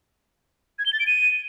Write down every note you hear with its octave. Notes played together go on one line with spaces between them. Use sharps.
G#6
G7
A6
D7
D#7